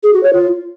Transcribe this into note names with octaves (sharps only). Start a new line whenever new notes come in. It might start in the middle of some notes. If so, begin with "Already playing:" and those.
G#4
F#4
C#5
F4